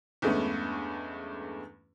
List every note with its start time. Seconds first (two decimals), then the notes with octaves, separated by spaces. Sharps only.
0.22 E2 G2 G#3 A3 B3 C#4